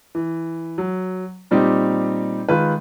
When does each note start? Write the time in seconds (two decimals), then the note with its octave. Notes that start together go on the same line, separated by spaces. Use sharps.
0.15 E3
0.78 F#3
1.51 A#2 G3 C4 D#4 G4
2.49 D#3 G#3 F4 B4